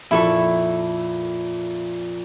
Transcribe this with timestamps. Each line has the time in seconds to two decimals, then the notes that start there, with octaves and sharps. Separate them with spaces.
0.11 F2 A#2 E4 A4 C#6